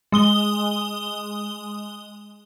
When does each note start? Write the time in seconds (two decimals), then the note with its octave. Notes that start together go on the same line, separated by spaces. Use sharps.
0.12 G#3 D#6 G7